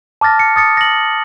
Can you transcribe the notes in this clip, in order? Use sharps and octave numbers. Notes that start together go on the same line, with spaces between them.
A5 D6 F6 A6 A#6
C#7
D#6 A6 C#7
A#6 F#7